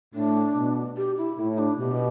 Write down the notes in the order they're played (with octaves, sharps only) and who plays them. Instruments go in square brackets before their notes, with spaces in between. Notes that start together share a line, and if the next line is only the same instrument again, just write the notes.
[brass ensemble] A2 [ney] D4
[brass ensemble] B2
[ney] G4
E4
[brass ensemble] A2 [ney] E4
[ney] E4
D4
[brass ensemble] B2 [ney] G4